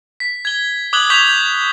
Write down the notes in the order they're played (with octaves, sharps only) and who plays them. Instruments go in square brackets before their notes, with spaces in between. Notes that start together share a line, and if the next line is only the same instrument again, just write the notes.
[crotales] B6
G#6 G7
D6 D#6 F#6 G#6 F#7 G7
C#6 G6 G#6 B6 F7 G7
G6